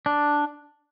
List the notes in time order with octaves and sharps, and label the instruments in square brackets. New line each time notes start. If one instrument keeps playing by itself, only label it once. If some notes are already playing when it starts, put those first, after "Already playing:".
[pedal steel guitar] D4